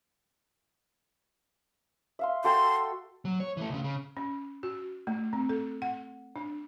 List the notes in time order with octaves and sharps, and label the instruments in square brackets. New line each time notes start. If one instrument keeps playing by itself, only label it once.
[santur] E5 F5 C6
[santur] F#4 A4 G5 [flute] C6
[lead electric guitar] F#3
C#5
E3 A3
C#2 C#3
C#3
[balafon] C#4
F#4
A3
C4
A4
F#5
D4